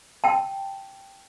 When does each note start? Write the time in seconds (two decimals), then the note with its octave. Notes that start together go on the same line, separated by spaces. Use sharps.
0.24 G5 A5